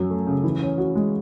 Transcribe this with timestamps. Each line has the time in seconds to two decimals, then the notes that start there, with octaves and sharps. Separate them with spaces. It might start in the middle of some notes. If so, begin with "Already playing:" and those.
Already playing: F#2 F#3
0.10 A3
0.27 C#3
0.44 E3
0.61 C#4
0.78 F#4
0.95 G#3